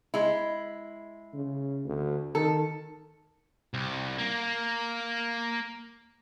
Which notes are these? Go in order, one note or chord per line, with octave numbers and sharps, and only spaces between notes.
G#3 E4
C#3
D2
D#3 A4
C2
A#3